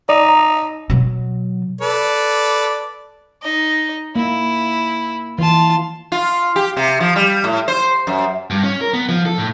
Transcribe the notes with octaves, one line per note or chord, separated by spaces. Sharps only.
D#4 D5
A#5
B2 F#3
A4 B4 D5
D#4 D#5
A#3 E4
E3 F4 A5
F4
G4
C3
F3
G3
A2
C5
F#2
G2
C#4
A#4
B3
F3
A4
A2